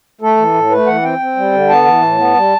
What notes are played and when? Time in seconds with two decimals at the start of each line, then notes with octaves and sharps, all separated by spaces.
0.21 A3 A4
0.37 E3
0.54 A2
0.70 A3 B4
0.87 E3 F#5
1.03 C4 G5
1.19 C4
1.36 G3
1.52 D3
1.69 B3 A5
1.85 E3
2.01 A2
2.18 B3
2.34 G3